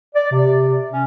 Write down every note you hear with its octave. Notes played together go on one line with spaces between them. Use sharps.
D5
C3
C#4